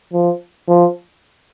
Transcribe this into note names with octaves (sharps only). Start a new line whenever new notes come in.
F3
F3